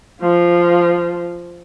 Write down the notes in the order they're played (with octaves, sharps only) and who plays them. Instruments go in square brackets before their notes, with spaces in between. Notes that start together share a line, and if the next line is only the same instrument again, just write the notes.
[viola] F3 F4